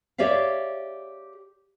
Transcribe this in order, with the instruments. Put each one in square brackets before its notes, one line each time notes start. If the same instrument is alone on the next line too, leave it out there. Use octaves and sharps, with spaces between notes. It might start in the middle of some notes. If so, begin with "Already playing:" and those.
[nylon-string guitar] G4 C#5 D5 E5 F5